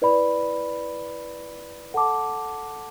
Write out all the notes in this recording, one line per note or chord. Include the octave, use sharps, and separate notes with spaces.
E4 B4 D5 B5
A4 F#5 A5 D6